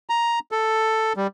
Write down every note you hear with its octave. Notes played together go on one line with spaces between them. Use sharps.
A#5
A4
G3